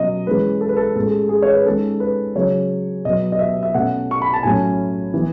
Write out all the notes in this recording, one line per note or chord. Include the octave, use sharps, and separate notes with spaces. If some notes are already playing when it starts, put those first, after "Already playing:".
Already playing: B2 F#3 C#4 D#5
E3 G#3 C#4 B4
A4
B4
A4
A2 G#3 C#4 A4
G#4
G#4
C#5
B4
D#3 G#3 C#4 A4
B4
C#3 F#3 C#4 C#5
B2 F#3 B3 D#5
D#5
E5
E5
B2 A3 C#4 F#5
C#6
B5
A5
A2 F#3 A3 C#4 G#5
E3 B3